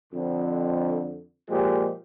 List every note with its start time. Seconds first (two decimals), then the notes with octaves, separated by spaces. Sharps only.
0.13 F2 D3
1.49 A#2 F3 G#3 G4